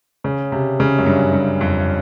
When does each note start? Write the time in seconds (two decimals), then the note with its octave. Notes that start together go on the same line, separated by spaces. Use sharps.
0.24 C#3
0.52 C3
0.80 C#3
0.98 F#2
1.06 G2
1.33 G2
1.61 F2